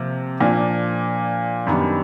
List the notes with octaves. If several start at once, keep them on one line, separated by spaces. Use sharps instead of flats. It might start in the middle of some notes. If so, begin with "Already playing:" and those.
Already playing: C3 F3 A#3
A#2 F3 A#3 D4
F#2 D#3 G3 B3 D4